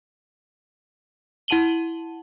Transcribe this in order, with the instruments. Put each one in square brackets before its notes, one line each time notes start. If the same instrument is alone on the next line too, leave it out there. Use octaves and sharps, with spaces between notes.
[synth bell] E4 F#5 A5 D#7 F#7 G7